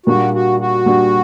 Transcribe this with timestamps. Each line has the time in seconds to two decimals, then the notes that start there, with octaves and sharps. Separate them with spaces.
0.06 A#2 G3 A#3 D4 F#4
0.34 F#4
0.60 F#4
0.86 A#2 G3 A#3 D4